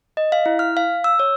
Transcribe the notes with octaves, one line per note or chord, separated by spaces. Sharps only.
D#5
F5
E4
F6
F5
E6
C#5